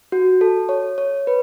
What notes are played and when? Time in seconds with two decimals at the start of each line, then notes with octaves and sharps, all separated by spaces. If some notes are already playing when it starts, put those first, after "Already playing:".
0.12 F#4
0.41 A4
0.69 C#5
0.98 C#5
1.27 B4